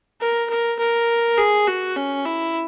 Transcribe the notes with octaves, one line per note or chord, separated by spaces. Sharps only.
A#4
A#4
A#4
G#4
F#4
C#4
E4